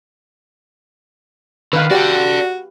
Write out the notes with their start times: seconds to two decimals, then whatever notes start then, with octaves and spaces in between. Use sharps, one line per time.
1.73 D3 D#3 B4 F5
1.91 F#4 G4 D5 F#5